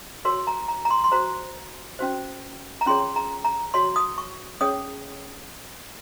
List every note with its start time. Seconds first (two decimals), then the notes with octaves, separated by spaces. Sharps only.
0.25 F#4 A#4 C#5 C6
0.47 A#5
0.68 A#5
0.85 A#5
0.91 C6
1.04 C6
1.12 F#4 C5 A#5
1.99 C#4 F#4 C5
2.81 A#5
2.86 C#4 F4 G#4 C#5 C6
3.16 A#5
3.45 A#5
3.74 F#4 C#5 C6
3.96 D#6
4.18 C#6
4.61 C#4 G#4 C#5 D#6